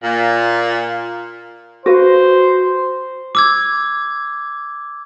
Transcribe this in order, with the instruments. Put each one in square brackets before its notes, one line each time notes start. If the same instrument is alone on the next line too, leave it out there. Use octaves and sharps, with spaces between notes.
[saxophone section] A#2
[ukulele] F#4 B4 F5 [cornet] C5
[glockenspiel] D6 E6 G#6